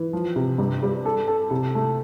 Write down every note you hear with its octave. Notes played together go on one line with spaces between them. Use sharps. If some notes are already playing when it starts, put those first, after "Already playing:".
Already playing: E3
F3
C3
G2
G3
A4
A4
C3
A3